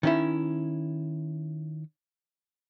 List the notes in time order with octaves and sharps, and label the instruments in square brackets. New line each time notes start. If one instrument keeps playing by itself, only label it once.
[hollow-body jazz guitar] D#3 C#4 E4